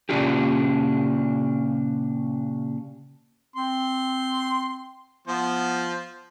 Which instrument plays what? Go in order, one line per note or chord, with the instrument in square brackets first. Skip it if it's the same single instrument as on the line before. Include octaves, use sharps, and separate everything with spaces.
[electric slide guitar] A#2 C#3 C#4 D4 F4 G4
[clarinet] C4 [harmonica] C6
[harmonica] F3 C5 [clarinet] B3